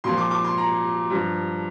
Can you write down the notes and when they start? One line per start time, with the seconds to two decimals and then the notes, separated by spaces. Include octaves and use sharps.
0.04 A#2 F3 C6
0.18 D6
0.31 D6
0.44 C6
0.58 A#5
1.10 G2 F3